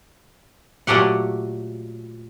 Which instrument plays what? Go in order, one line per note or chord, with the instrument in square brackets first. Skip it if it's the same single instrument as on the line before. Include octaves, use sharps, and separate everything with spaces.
[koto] A#2 F#3 A3 G4 F#5